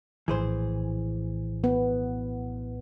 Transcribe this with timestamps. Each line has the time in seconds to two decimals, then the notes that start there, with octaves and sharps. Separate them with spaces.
0.28 A#1 A2 E3 G#4 C5
1.64 B3